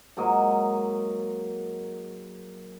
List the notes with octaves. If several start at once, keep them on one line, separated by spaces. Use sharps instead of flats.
G#2 F#3 A#3 D#5